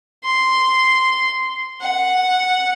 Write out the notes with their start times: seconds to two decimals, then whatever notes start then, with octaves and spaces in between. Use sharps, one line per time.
0.24 C6
1.81 F#5